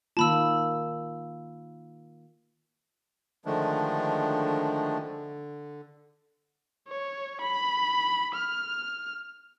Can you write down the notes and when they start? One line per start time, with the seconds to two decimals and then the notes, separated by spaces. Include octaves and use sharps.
0.17 D#3 A#3 F4 A5 B5 E6
3.45 D3 D#3 F3 G#3 A3 D4
5.00 D3
6.88 C#5
7.41 B5
8.35 F6